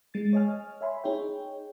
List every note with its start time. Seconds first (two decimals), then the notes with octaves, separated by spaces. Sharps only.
0.14 G#3 A6
0.33 C#5 D#5 G#5 F6
0.81 C#5 E5 G#5 B5 C6
1.04 D#4 G#4 C#5 G5